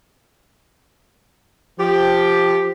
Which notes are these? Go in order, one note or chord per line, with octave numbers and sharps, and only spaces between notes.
F3 G4